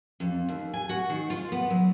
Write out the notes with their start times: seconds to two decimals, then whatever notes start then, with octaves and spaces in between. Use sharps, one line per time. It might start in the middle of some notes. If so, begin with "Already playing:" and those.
0.20 F2
0.49 D#2
0.73 G#5
0.89 F#4
1.10 D#3
1.30 F4
1.52 B3
1.70 F#3